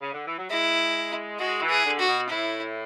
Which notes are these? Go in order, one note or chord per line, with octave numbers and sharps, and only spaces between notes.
C#3
D3
E3
F#3
G#3 E4
G#3 F#4
E3
G#4
D3
F#4
B2
A2 E4